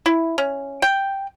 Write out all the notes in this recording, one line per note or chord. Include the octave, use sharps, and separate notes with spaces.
E4
C#4
G5